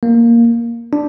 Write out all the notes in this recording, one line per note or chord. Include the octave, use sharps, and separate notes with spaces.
A#3
D4